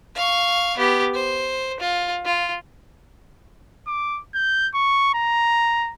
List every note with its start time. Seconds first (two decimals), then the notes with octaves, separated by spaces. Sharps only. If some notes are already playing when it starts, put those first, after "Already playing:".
0.16 F5 C#6
0.78 B3 G4
1.14 C5
1.80 F4
2.25 F4
3.87 D6
4.35 G6
4.75 C#6
5.14 A#5